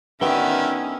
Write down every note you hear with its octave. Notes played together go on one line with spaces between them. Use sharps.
D3 D#3 B3 C#4 F#4 E5 G5